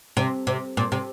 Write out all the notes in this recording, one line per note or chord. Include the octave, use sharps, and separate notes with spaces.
C3
C3
A#2
C3